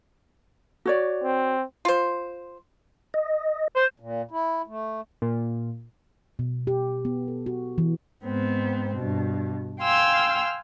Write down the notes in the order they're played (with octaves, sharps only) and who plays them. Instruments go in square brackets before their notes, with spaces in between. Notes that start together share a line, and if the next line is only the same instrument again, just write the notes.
[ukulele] F#4 C#5 D5
[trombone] C4
[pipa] F4 C5
[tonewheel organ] D#5
[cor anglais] C5
[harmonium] A#2
E4
A3
[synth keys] A#2
[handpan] B2
G4
B3
A4
F#4
E3
[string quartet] G#2 B3 C4
G2 B2
F5 G5 G#5 C6 E6 F6